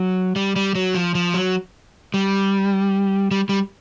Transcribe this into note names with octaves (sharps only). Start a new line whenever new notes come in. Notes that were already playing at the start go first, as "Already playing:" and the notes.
Already playing: F#3
G3
G3
F#3
F3
F3
F#3
G3
G3
G3